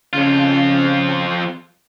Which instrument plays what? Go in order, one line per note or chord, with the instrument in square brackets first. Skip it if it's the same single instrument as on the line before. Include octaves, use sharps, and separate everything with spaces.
[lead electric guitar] F2 F4 [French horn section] C#3